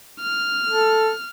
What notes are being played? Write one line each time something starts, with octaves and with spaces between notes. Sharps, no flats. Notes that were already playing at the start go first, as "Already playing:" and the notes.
F6
A4